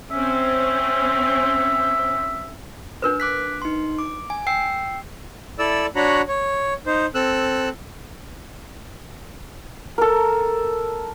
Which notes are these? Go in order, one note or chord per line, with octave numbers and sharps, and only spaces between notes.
C4 C#4 E5
D4 A#4 B4
D6 F#6 B6
D#4 C6
D6
G#5
G5 E6 C7
E4 A4 D5 E6
D4 F#4 C#5 F#5 A#5 B5
C#5
D#4 C5
C4 A4 E6 F#6
A4 A#4